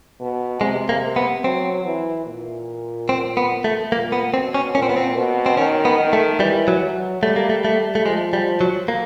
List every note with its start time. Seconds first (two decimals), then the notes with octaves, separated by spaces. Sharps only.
0.20 B2
0.61 C3 G#3
0.89 A#3
1.16 B3
1.44 F#3 C4
1.85 E3
2.26 A#2
3.09 C4
3.37 B3
3.64 A3
3.92 A#2 A#3
4.12 B3
4.34 B2 C4
4.54 C#4
4.75 A#2 C#4
4.82 C4
4.89 B3
4.97 C4
5.16 B2
5.46 C4
5.57 D#3 C#4
5.85 B3
5.99 D#3
6.13 A3
6.40 E3 G3
6.68 F#3
6.81 F#3
7.23 G3 A3
7.36 A#3
7.50 A3
7.64 G3 A3
7.95 A3
8.05 F3 G#3
8.33 G3
8.61 F#3
8.88 A#3